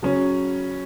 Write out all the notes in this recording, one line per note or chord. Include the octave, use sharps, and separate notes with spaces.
C#3 F#3 C#4